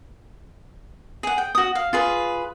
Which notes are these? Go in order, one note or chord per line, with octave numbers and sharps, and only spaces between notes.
G#4 F#5
G5
F#4 D#6
F5
F4 G#4 B4